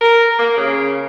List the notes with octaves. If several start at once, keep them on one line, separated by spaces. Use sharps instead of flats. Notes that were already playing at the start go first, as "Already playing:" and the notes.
A#4
A#3
C#3